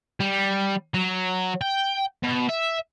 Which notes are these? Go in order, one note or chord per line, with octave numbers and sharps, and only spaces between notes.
G3
F#3
G5
B2
E5